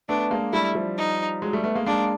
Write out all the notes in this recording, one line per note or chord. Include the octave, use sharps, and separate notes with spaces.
A3 B3 D4
G#3 A#3
G3 A3 E4
F3 G3
D#4
F#3 G#3
G3 A3
A3 B3
G#3 A#3
G#3 A#3 D4